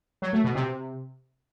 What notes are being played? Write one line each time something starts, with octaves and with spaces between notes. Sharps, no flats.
F#3
A3
B2
C3